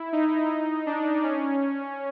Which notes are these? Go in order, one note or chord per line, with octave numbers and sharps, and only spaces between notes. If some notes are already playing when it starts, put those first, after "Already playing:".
Already playing: E4
D#4
D4
C#4